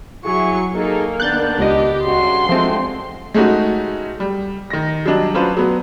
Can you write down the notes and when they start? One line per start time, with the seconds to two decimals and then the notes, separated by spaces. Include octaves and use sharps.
0.24 F#3 E4 G#4 C#6
0.75 A#3 D#4 G#4 A4
1.20 D#3 B3 D4 F#6 G6 A6
1.59 C#2 G4 D#5
2.03 G2 C#3 F#4 C6
2.49 D3 F3 G#3 A3 C4
3.34 G#3 A3 C#4 D#4 F#4
4.20 G3
4.70 D#3 A#6
5.06 F#3 G3 D4 D#5
5.34 F#3 C#4 D4 F4 B4 C5
5.57 F#3 B3